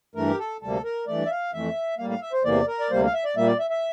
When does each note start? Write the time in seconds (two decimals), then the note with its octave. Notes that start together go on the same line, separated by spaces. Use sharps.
0.15 G2 E3 A3 A#4
0.27 G4
0.39 A4
0.61 D2 C3 G3 A#3 A4
0.84 A#4
1.07 G2 E3 A3 D5
1.26 E5
1.30 F5
1.53 F2 E3 A3 E5
1.98 A2 G3 A#3 F5
2.10 F5
2.22 E5
2.33 C5
2.45 E2 C3 E3 A#3 D5
2.67 A#4
2.80 D5
2.90 D2 C3 G3 A#3 C5
3.05 F5
3.14 E5
3.25 D5
3.36 A#2 G3 A#3 E5
3.47 D5
3.60 E5
3.70 E5